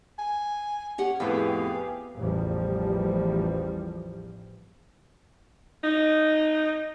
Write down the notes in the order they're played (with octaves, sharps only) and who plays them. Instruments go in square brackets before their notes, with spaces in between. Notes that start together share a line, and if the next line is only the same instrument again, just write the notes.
[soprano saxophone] G#5
[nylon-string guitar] C#4 G4 F#5
[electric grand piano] F2 A2 [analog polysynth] B3 G4 G#4 [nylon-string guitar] B4 G5 [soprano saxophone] F5
[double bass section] A1 E2 F3 G3
[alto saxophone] D#4